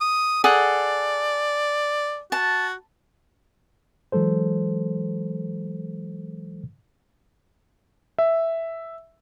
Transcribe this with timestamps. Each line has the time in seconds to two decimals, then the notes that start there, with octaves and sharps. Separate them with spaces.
0.01 D#6
0.44 G#4 A4 D5 F#5
2.32 F#4 A5
4.12 E3 F#3 G#3 A4 C5
8.19 E5